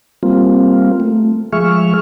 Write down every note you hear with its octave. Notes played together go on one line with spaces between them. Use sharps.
G3 A#3 C4 F4
A3
F3 G#3 G#4 E5 C#6 F6